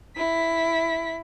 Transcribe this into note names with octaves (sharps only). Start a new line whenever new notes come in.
E4 B6